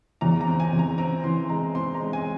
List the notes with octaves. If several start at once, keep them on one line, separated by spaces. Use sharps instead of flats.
E2 A#5
A#5
C4
G#5
E2
A#5
C4 A#5
E3 C6
G#3 A#5
C4 C6
A#5
G#3
G#5